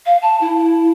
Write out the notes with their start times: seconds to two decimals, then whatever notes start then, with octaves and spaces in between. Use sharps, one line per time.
0.06 F5
0.22 A5
0.41 E4